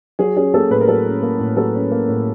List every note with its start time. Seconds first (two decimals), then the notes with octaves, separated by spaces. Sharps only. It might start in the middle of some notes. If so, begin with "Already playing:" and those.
0.19 F#3 G#4
0.37 C#4 G#4
0.54 A#3 A4
0.70 A2 B4
0.81 A#4
0.88 F#3 A4
1.06 C#4
1.23 A#3
1.39 A2
1.57 F#3 A4
1.75 C#4
1.91 A#3
2.09 A2